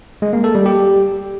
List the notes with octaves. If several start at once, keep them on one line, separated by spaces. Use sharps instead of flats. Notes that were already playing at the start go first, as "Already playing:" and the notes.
G#3
A#3
A4
G3
G4